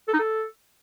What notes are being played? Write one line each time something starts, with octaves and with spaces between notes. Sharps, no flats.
A4
D#4
A4